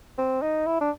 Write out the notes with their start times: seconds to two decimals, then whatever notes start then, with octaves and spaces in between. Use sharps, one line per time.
0.18 C4
0.42 D#4
0.67 E4
0.81 D4